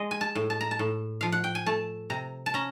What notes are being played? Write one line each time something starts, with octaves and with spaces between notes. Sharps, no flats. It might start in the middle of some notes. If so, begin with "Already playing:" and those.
Already playing: G#3 D#5
G#5
A5
A2
A5
A#5
A5
A2
F3 F5
F#5
G5
G#5
A3 A5
C3 A#5
A5
C#4 A#5